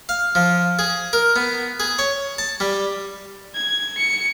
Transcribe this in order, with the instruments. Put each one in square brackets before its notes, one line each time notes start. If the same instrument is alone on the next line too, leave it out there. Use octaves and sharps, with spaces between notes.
[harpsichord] F5
F3
G#4
A#4
B3
G#4
C#5
A5
G3
[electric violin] G#6
C#7